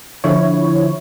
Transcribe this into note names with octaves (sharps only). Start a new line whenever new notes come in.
D3 F3 E4 C#5